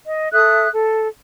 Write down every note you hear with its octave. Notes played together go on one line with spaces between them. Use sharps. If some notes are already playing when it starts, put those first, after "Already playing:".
D#5
A4 E5 D#6 F#6
A4